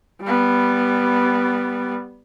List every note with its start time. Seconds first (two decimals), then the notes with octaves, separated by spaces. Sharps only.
0.22 G3 B3